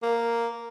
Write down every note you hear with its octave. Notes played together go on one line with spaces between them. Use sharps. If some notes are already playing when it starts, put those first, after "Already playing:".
A#3